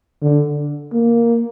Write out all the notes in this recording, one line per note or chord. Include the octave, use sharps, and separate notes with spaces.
D3
A#3